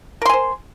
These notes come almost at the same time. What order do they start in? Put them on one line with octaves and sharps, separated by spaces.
A#4 C6 G#5 C5